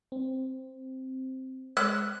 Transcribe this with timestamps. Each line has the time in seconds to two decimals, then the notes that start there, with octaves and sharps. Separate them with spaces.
0.12 C4
1.77 G#3 F#6